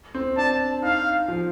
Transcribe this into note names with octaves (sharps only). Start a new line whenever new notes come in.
C4
D4 A5
D#4 F5
F3